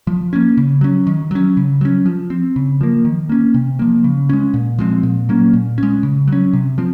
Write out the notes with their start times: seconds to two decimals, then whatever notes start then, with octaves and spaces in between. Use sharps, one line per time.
0.07 F3
0.33 A#3 C#4
0.57 C#3
0.81 F#3 C#4
1.07 D#3
1.31 F#3 C#4
1.57 C#3
1.81 F#3 C#4
2.06 F3
2.30 C4
2.56 C#3
2.81 F3 A#3
3.05 D#3
3.29 A#3 C#4
3.54 C3
3.79 F3 A#3
4.04 C#3
4.29 G#3 C#4
4.54 A#2
4.79 F3 G#3 C4
5.03 A#2
5.29 F#3 A#3 C#4
5.53 A#2
5.78 G#3 C#4
6.03 C#3
6.28 F#3 C#4
6.53 C3
6.78 F3 C4